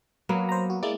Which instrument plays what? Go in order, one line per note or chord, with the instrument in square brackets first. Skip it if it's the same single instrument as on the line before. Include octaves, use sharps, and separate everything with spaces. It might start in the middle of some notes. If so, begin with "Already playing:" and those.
[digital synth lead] F#3 [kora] A#3 B3
[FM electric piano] C5 A#5
F#4
[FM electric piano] G#3 A#3 E4 [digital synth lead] D5